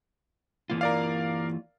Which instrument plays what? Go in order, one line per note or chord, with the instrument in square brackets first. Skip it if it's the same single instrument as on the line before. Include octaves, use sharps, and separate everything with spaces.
[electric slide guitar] E3 A#3 F4
[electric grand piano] A#4 D5 F5